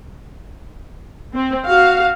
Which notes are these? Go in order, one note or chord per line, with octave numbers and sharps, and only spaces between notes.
C4
F#4 F5